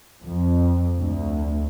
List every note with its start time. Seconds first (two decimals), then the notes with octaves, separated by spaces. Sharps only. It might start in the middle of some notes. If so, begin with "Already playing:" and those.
0.22 F2
0.99 D2